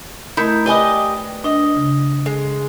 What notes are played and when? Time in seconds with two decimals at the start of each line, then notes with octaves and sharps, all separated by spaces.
0.37 A3 D#4 E4 A#4
0.66 G4 B4 D5 D#5 G#5
1.44 D4 D#5
1.76 C#3
2.26 G#3